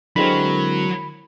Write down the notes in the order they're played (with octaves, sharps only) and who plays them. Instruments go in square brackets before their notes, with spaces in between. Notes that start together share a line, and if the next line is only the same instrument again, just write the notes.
[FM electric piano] D3 G#3 C4 [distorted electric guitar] F#3 [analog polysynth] E4 F#4 A#4 [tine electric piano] B5